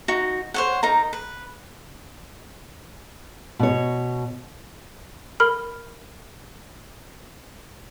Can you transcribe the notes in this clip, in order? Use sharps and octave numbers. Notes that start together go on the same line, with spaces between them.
D#4 F#4
C5 C#5 F#5
D#4 A#4 A#5
B4
B2 C#5
A#4 B5 F6